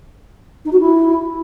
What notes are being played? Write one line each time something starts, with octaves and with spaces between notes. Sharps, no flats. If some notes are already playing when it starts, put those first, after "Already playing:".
D#4
F#4
E4